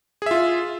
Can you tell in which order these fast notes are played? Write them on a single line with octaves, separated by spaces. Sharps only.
G#4 E5 F4